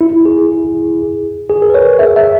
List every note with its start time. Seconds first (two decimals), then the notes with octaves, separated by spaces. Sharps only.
0.01 E4
0.25 G#4
1.49 G#4
1.62 A#4
1.70 B4
1.74 C#5
1.99 E5
2.16 E5